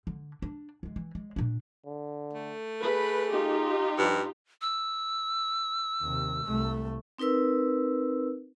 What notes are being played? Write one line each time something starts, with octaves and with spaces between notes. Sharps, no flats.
D3
D4
D3 G#3
E3
G#3
A#2 D4
D3
A3
G#4 B4
D#4 F4 G4
G2 F3
E6
D#2 C3
C2 A3
C4 D#4 A#4 B4 E6